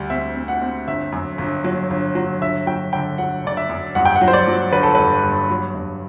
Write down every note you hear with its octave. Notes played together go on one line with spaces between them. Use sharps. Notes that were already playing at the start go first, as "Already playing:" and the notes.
Already playing: D2 G3
C4 E5
C4
F#5
C4
G1 E5
F#2
G1
F#3
G1
F#3
G1 E5
F#3 G5
D3 G5
F#3 F#5
D3 D5
E5
F#2
G2 F#5
G5
F#5
F#3
C5
D5
F#3
G1 B4
A4
G2 B4
G2
F#3
G2